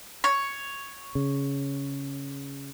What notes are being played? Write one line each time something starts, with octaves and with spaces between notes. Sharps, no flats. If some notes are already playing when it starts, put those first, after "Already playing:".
C#5
C#3